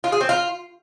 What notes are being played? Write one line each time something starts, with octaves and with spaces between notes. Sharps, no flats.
F4
G#4
C4
F4